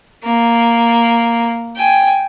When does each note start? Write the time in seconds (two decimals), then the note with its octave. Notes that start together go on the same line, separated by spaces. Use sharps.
0.24 A#3
1.76 G5 G#5